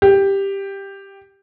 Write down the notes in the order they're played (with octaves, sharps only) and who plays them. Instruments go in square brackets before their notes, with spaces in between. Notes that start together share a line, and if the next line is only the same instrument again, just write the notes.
[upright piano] G4